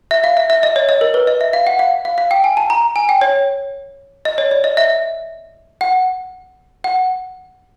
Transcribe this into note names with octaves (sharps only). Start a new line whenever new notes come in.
E5
F5
E5
E5
D#5
C#5
D#5
A#4
B4
D#5
E5
F5
F#5
F5
F5
F5
G5
G#5
A5
A#5
G#5
G5
C#5
D#5
C#5
D5
D#5
E5
F#5
F#5